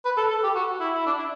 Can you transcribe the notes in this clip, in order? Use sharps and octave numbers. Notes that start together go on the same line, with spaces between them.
B4
A4
A4
G4
F#4
E4
E4
D4
E4